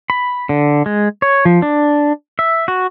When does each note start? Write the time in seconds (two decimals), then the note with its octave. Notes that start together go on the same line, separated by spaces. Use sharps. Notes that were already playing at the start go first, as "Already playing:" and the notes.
0.10 B5
0.49 D3
0.86 G#3
1.22 C#5
1.45 F3
1.62 D4
2.39 E5
2.68 F#4